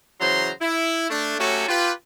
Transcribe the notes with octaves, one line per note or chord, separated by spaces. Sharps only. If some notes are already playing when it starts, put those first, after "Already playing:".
C#3 E3 F#3 C5 A#5 C6
E4
A3 D4
F#3 A3 C#4 F#4 G4 A4
F4 G4 B4